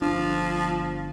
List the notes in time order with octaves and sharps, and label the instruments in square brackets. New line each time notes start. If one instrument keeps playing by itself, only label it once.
[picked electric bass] G1 D4 [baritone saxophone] F3